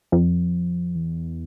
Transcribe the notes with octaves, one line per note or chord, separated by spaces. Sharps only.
F2
E2